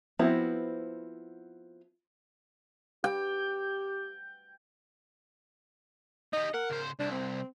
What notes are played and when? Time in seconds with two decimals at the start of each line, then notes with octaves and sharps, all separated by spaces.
0.19 F3 B3 C4 E4 F#4
3.04 G4 G5
6.33 D#4 G4 D#5
6.54 A#4 F#5
6.70 C#2 C5
6.99 C2 D4
7.11 C4